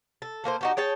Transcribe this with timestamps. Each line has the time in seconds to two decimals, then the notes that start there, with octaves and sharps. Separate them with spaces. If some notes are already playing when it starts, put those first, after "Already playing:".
0.22 A4
0.44 A3 A#3 F#4 C5
0.61 D#4 F#4 G4
0.77 G#4 C#5 G5 A5